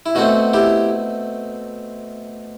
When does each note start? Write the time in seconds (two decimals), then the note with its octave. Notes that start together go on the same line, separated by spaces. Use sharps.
0.06 E4
0.15 B2 A3 C4 F#4
0.53 E4 G4